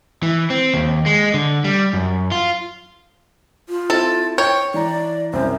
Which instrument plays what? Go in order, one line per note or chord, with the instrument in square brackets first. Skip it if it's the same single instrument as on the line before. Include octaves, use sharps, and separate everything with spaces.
[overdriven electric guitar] E3
C4
D#2
G#3
D3
G3
F#2
F4
[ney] F4
[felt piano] C4 E4 [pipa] A4
[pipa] C#5 [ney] G5 [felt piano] G6
[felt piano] E3 A#5 [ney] D5
[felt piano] C2 F#2 [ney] C5